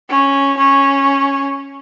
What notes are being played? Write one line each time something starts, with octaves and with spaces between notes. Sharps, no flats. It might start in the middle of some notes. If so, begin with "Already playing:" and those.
C#4
C#4